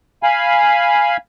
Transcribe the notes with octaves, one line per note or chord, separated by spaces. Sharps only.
F5 G#5 B5